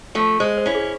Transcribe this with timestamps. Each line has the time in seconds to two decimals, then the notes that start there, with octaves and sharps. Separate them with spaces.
0.15 F3 A3
0.40 G#3 C5
0.58 C5
0.66 C#4 E4
0.75 G#4